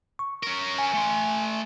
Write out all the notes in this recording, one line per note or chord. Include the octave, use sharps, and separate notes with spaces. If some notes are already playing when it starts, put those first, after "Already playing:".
C#6
C#4 A#4
G#5
A3 C6